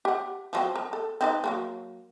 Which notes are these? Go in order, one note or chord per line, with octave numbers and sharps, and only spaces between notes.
G4 F#5
F3 F#3 C4
A#4 A#5
A4
C4 D#4 B4
F#3 A3 A#3